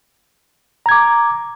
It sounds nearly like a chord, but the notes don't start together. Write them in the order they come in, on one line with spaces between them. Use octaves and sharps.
A#5 G#6 D6